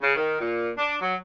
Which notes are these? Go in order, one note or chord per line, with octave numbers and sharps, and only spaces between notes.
C#3
D#3
A#2
D4
F#3